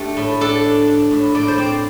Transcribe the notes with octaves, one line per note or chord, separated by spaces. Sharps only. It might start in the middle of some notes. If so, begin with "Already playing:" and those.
Already playing: A3 D4 G4
A2
D4 A4
D4
D4
A2
A2 D5
C5
C4 D5